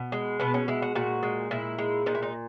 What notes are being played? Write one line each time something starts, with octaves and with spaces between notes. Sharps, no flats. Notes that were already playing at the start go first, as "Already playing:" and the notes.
Already playing: B2
G#3
B2 B3
C#4
G#3 E4
F#4
A#2 F#4
G#3
A#2 E4
G#3
A#2 D#4
E4
D#4